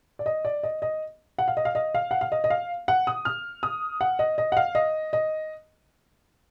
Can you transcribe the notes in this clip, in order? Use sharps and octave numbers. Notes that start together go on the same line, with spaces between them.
D5
D#5
D5
D#5
D#5
F#5
F5
D#5
F5
D#5
F5
F#5
F5
D#5
D#5
F5
F#5
D#6
F6
D#6
F#5
D#5
D#5
F#5
F5
D#5
D#5